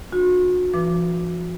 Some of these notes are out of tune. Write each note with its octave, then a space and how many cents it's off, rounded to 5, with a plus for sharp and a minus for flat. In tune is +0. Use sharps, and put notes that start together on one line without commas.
D4 +25 F#4 -35
F3 -45 B4 +0 D6 +0